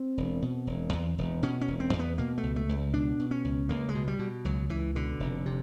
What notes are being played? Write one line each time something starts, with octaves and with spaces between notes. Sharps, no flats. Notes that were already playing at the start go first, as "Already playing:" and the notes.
Already playing: C4
E1
B2
E1
E2
E1
B2 C#4
C#4
E1
C4
E2
B3
B2 A#3
A3
C#2
A3
C#2
B2 D4
B2
C#4
C#2
C#2 A#3
G#3
B2
G3
B2
C#2 F#3
C#2 E3
B2 D3
F1
C3